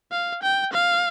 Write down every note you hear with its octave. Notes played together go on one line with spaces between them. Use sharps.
F5
G5
F5